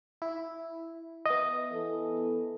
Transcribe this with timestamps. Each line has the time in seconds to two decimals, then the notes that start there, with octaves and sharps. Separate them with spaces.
0.22 E4
1.26 B3 E4 D#5
1.72 E3 A4